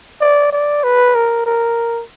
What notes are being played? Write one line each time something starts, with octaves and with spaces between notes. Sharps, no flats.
D5
D5
B4
A#4
A#4